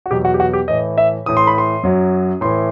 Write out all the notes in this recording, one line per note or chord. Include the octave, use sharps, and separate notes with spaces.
F#4
E2 B2 F#3 G4
F#4
G4
F#4
G4
A2 E3 D#5
E5
A2 E3 D#6
C6
B5
C6
F#2 F#3
A2 E3 C6